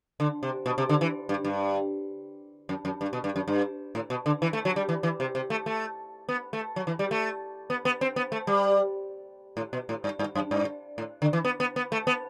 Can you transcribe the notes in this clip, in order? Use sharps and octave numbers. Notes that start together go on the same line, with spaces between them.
D3
C3
B2
C3
D3
E3
G2
G2
F#2
F#2
G2
B2
G2
F#2
G2
A2
B2
D3
E3
A3
F#3
G3
E3
E3
C3
C3
A3
A3
B3
A3
F#3
E3
G3
A3
B3
B3
C4
B3
A3
G3
A2
B2
A2
G2
G2
F#2
G2
A2
D3
E3
B3
B3
B3
A3
B3